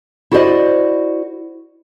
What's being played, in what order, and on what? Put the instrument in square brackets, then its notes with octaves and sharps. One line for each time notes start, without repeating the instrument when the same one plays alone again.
[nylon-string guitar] E4 F#4 A4 C5 D5 D#5